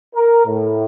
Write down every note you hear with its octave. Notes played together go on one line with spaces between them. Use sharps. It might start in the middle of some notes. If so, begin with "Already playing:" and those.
A#4
A2